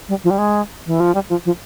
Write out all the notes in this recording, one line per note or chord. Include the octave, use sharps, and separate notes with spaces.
G3
F3
G3
G#3
E3
F3
G3
F3
F3